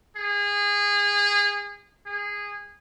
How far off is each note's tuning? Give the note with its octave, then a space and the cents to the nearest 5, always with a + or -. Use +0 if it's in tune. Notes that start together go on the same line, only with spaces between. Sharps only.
G#4 -25
G#4 -15